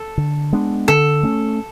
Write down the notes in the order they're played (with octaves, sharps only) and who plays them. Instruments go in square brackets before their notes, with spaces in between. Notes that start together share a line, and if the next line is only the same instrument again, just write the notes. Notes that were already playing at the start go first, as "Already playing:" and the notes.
Already playing: [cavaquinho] A4
[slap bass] D3
G#3 B3 D4
[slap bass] D3 [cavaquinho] A4
[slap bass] A3 C#4